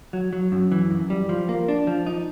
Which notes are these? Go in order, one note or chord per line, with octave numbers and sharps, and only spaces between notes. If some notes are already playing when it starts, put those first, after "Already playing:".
F#3
F#3
F#2
E3
F#2
G3
F3
A#3
D4
F3
D#4